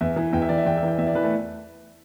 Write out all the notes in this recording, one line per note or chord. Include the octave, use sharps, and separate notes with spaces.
E2 E5
E3
E2 G5
E5
E3 D5
E5
E2 G5
E5
E3 G5
E2 E5
D5
E3 B4
A3